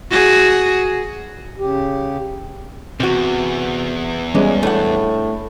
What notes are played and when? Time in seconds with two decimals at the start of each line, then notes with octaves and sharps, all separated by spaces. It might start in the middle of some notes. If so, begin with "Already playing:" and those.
0.11 F#4 G#4
1.59 C#3 G4
3.00 E2 C3 F#4
4.35 E3 G3 G#3 B3 C#4
4.63 A2 A3 D4 F#5